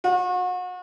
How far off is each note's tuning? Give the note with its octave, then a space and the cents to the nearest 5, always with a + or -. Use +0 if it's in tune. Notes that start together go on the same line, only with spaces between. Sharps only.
F#4 -35